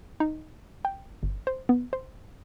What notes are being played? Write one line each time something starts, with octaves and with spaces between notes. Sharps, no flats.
D#4
G5
G1
C5
B3
C5